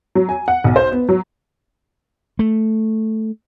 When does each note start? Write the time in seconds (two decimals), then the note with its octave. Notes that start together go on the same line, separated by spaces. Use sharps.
0.15 F#3
0.29 G#5
0.48 F#5
0.64 B1
0.76 C5
0.92 B3
1.09 F#3
2.39 A3